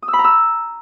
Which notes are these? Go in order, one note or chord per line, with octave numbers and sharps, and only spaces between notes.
D#6
E6
B5
A#5
E6